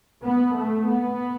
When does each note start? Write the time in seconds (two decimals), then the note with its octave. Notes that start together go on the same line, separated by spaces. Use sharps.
0.24 B3
0.55 A3
0.87 B3